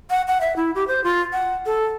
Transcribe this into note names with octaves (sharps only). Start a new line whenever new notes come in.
F#5
F#5
E5
E4
G4
C5
F4
F#5
A4